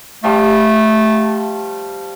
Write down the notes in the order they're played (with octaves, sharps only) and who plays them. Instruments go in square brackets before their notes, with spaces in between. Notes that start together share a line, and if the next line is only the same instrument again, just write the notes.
[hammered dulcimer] F3 G3 [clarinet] A3